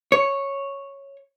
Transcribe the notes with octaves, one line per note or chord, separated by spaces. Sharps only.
C#5